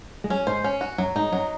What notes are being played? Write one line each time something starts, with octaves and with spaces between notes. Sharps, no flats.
G#3
F#3 C#4
G#2 C5
C#4
F#4
F#2 F#3
G#2 D#4
F#2 F#3